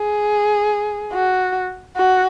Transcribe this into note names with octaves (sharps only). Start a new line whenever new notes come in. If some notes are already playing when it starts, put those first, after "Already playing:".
Already playing: G#4
F#4
F#4